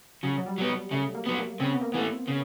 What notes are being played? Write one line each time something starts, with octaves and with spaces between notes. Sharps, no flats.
C#3 F#3
F#3
G3
F#3 B3
G3
C#3 A3
A#3
F#3 B3
A#3
C#3 C4
B3
A#3
E3 A3 B3
C#3